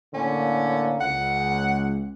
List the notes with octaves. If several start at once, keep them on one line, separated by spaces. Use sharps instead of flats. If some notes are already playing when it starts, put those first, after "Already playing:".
A2 D3 A#3 C#4
C#2 F#5